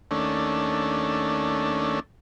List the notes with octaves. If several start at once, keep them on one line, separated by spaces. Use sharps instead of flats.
D#2 A3 C#4 D4